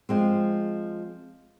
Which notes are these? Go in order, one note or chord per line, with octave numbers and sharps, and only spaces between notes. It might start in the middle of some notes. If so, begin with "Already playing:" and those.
F3 G#3 C4